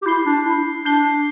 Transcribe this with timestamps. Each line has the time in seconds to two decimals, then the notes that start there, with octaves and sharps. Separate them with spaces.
0.02 G4
0.06 E4 G6 C7 G7
0.26 D4
0.45 E4
0.85 D4 G6 C7 G7